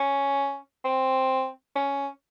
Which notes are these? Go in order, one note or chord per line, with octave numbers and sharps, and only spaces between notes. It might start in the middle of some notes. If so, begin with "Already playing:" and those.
Already playing: C#4
C4
C#4